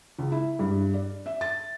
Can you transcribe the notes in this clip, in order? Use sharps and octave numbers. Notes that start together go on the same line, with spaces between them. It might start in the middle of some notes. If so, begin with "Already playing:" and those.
C#2
E4
G2
D5
E5
A6